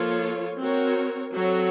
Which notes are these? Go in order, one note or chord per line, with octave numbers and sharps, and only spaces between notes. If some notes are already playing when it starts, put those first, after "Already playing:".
Already playing: F3 A#3 F4 A4 C#5
C4 F#4 A#4 C#5
F#3 C4 F#4 A4 C#5